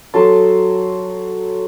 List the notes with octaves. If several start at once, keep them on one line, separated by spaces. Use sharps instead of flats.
F#3 A4 A5 C6